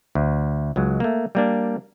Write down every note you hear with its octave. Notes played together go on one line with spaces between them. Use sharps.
D2
C#2 F#3 G#3
A3 A#3
G3 A#3 D4